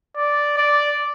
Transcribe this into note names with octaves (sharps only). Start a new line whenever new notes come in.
D5
D5